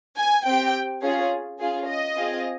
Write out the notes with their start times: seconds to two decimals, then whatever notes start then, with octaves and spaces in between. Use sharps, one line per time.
0.17 G#5
0.46 C4 G4 G5
1.03 C#4 F4 G#4
1.59 C#4 F4 G#4
1.88 D#5
2.17 C4 F4 G#4